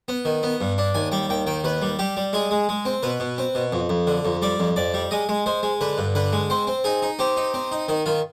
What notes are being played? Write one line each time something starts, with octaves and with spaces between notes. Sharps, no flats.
B3
D#3
B3
G2
D4
D#2 G#5
G3 G5
D#2 G5
D#3 G5
D#2 B4
G3
G3 G4
G3
G#3 G#4
G#3
G#3
C4
B2 B4
B2
C4
B2
F2
F2
D3
F2
G3 D5
F2
F2 D5
G3
G#3 D#5
G#3
G#3 C5
G#3
D3 B4
G2
D3 B4
G#3
C4 C5
C4
D#4 G#4
D#4
C4 G4
D#4
C4
D#4
D#3 D#4
D#3 F4